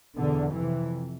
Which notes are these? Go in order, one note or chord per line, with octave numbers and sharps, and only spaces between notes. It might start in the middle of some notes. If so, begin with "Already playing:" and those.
E2 B2 D3
F2 C3 E3